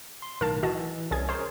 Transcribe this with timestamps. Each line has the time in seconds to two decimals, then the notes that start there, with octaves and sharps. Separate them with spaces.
0.22 C6
0.41 B1 A2 D#3 A#4 F5 A5
0.63 E3 F#4 D#5 A5
1.11 C2 C#4 G#4 G#6
1.29 G#4 A#4 C5 C#5